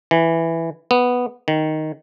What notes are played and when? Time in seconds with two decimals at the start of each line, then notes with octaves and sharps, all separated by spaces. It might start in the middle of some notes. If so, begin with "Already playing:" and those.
0.11 E3
0.91 B3
1.48 D#3